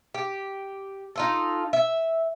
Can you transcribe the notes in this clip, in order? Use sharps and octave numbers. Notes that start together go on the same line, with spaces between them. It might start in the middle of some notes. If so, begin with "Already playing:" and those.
G4
D#4 F4 A4
E5